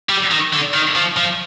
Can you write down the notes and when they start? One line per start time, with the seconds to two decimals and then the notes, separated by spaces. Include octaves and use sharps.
0.09 G3
0.31 D#3
0.53 D3
0.74 D#3
0.96 F3
1.17 F3